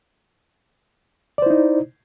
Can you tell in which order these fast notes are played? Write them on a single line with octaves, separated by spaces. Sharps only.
D5 C5 E4 D#4